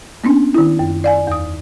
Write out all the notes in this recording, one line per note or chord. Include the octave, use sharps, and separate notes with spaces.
A#3 B3 C#4 D4
D#3 E4
F#2
D5 F5 G#5
E2 D#6